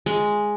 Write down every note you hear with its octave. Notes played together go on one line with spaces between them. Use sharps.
G#3